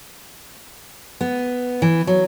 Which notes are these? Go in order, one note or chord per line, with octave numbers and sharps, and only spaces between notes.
B3
E3
F#3